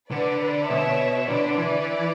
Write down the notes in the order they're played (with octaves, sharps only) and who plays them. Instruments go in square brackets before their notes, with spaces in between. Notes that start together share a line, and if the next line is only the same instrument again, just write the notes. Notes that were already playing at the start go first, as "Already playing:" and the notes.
[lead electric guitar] D3 [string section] B4 D5
[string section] B4 D5
[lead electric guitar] B2 [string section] C#5 E5
[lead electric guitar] D3 [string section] B4 D5
[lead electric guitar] E3 [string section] B4 D5